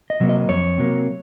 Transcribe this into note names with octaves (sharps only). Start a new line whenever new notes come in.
D#5
C3 F#3 A#3
D#5
F2 C#5
C3 F#3 A#3